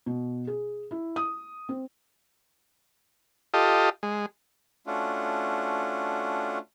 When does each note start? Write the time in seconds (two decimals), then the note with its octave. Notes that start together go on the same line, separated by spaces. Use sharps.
0.06 B2
0.47 G#4
0.91 E4
1.16 D#6
1.69 C4
3.54 F4 G4 A4 D#5
4.03 G#3
4.87 A3 C#4 D4 F4 F#4